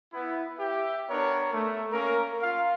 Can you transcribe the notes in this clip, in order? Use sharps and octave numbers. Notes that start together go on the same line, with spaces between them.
B3 E4
G4 E5
B3 D4 A#4 C#5
A3
A#3 C#4 A#4
F4 F5